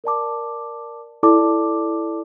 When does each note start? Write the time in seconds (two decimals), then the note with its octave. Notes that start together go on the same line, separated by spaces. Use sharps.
0.04 A#4 D5 A5 D6
1.23 E4 A4 D5 A5 D6